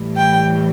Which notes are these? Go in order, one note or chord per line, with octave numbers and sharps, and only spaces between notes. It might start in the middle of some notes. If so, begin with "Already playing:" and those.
Already playing: A2 E3 G3
G5